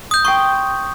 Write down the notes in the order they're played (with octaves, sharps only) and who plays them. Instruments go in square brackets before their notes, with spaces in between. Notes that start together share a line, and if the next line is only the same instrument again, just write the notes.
[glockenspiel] D#6 G6
[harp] G5 C6 D#6 [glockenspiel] C#6